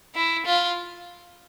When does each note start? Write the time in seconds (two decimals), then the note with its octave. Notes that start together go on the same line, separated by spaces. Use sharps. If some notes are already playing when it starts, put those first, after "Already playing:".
0.15 E4
0.46 F4